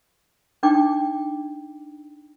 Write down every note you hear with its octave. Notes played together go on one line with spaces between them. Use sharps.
D4 D#4 G5 D6